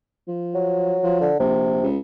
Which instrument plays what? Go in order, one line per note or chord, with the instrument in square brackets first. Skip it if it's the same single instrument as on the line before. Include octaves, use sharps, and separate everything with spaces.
[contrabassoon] F3
[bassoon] F#3
[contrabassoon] F3
[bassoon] D3
[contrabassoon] A#1 [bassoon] C3
[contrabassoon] C#2